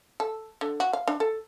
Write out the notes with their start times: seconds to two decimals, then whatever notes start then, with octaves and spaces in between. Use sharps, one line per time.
0.20 A4
0.61 D3
0.80 F#4
0.93 F5
1.08 D4
1.20 A4